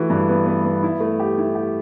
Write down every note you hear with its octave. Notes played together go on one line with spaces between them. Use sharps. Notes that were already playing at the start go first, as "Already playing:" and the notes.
Already playing: E3 A3 F#4
G2
B3
B3
B3
E4
A3
G4
E4
G4